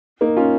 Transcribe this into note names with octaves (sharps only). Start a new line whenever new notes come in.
A#3 D#4
C#4 F4